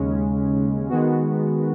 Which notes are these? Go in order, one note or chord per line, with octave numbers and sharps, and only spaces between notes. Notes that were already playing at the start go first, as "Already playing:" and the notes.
Already playing: D#2 C#3 G#3 C#4
D#3 G#3 B3 F#4